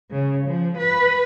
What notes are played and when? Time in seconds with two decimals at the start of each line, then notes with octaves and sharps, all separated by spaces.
0.11 C#3
0.47 F3
0.78 B4